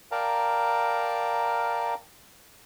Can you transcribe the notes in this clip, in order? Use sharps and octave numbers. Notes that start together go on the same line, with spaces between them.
A#4 D5 F5 G5 A5 A#5